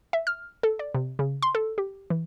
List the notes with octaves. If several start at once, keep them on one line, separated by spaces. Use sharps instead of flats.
E5
F6
A4
D5
C3
C#3
C6
A4
G4
E3